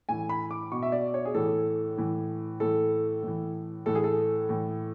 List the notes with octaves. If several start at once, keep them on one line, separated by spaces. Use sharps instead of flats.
A2 E3 G#5
B5
D6
B2 C#6
E5
D5
C#5
G#4
A2 E3 A4
A2 E3
A2 E3 A4
A2 E3
A2 E3 A4
G#4
A4
A2 E3